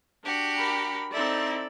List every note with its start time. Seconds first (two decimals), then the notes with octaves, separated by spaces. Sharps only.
0.24 D4 F#4 G4
0.57 A#4 B5
1.12 C4 D#4 E4 A4 D5